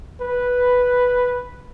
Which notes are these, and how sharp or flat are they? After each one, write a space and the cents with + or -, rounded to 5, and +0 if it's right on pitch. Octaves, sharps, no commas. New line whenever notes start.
B4 +0